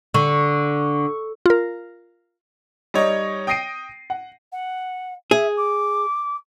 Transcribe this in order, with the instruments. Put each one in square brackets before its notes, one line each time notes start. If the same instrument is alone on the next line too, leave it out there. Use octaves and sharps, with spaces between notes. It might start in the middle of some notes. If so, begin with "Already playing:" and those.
[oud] D3 [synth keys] C#6
[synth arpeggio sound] F4 A#4
[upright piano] G3 D#4 C#5 D#5
G5 D#6 A#6 C7 D7 D#7
F#5
[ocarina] F#5
[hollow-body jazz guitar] G#4 [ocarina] E5
[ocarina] D6